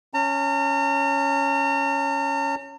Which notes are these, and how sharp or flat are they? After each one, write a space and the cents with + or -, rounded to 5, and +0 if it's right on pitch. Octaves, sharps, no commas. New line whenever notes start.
C#4 +0 A#5 -45